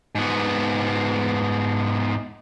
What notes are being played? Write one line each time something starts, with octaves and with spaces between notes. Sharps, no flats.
G#2 B3